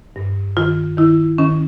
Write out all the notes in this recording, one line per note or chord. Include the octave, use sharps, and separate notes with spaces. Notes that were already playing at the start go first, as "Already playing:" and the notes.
G2
D#3 F4
D#3 E4
D#3 C#4